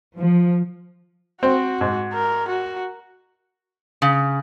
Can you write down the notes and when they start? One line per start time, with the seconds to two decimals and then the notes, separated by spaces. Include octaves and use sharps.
0.18 F3
1.43 C4 F#4
1.81 G#2
2.13 A#4
2.49 F#4
4.02 C#3